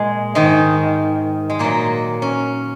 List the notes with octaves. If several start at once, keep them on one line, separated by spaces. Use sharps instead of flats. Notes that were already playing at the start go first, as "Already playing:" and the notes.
Already playing: A#2 G#3
G#2 D#3 G#3
G#3
A#2 F#3 A#3
C#4